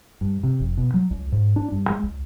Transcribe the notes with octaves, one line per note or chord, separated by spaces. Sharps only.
G2
C3
F1
B2
F#3
C#2
G#2
D4
G2
G#3
C#2